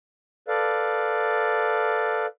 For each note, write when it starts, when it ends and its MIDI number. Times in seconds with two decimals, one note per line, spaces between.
0.48 2.26 69
0.48 2.26 71
0.48 2.26 74
0.48 2.26 77